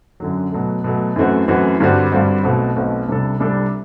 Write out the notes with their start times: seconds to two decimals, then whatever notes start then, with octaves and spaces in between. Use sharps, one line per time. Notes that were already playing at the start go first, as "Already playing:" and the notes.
0.20 F#2 D3 F#3
0.52 B2 F#3 A3
0.84 B2 F#3 A3
1.16 F#2 E3 A3 C4 F#4
1.48 F#2 E3 A3 C4 F#4
1.80 G2 D3 G3 C4 F#4
2.12 G2 D3 G3 C4 F#4
2.43 B1 B2 A3 C4 F#4
2.76 B1 B2 A3 C4 F#4
3.08 C2 C3 G3 D4 A4
3.40 C2 C3 G3 D4 A4